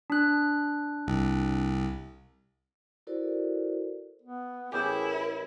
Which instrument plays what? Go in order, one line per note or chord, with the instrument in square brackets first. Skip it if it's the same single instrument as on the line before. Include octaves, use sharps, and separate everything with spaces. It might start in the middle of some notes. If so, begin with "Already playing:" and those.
[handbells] D4 F#6
[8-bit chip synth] C2
[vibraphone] E4 F#4 A4 A#4 C5 D5
[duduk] B3
[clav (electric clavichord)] A1 G4 [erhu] E4 [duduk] G#4 [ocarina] A#4